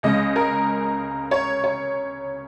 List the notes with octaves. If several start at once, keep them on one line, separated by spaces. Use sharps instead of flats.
C#2 C#3 G#3 D#5
A#4
C#5
C#5